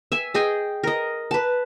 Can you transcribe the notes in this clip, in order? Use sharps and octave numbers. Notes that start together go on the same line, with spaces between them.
E5 G#5
G#4 D#5 G5 G#5
A#4 D#5
B4 A5